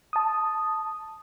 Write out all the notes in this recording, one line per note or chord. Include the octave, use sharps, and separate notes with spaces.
A5 D#6